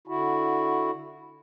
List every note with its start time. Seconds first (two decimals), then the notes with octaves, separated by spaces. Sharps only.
0.07 D3 E4 F#4